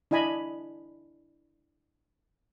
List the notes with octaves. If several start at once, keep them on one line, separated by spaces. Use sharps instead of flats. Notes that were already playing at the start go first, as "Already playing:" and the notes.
D4 E4 D#5 G#5 B5